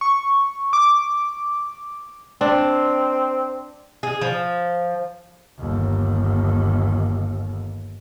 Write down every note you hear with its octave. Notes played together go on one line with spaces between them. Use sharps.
C#6
D6
C4 D4
G#4
F3
G1 D#2